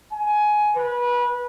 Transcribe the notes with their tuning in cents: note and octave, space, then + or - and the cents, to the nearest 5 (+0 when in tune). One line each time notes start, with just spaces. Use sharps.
G#5 +15
B4 -25